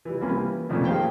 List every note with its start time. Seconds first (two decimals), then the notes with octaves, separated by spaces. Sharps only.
0.05 E3 G3
0.21 C2 A#3 C#4 G#5 B5
0.34 E3
0.69 F2 A#2 D#3 F3 A3 C#4
0.85 G3 A#3 G#4 C5 F5 G5